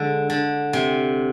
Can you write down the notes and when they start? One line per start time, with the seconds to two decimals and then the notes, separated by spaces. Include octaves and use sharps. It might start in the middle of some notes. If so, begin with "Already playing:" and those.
Already playing: D3 G#3
0.30 D3
0.73 C3